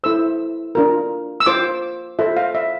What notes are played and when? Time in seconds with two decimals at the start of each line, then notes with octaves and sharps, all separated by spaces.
0.04 E4 A4 C5 E6
0.75 D4 F4 A#4
1.40 E6
1.46 F4 C5 D6
2.19 F4 A4 C5 E5
2.37 F5
2.55 E5